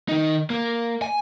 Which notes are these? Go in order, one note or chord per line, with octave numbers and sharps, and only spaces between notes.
D#3 D#4
A#3
G#5